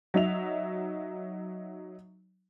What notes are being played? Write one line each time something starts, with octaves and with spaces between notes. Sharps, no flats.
F#3 D#4 E5 F7